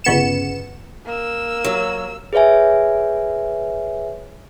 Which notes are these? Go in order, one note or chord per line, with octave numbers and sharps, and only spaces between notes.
G1 C#3 B3 C#7 E7
A#3 E6
F#3
G#4 B4 C#5 E5 G#5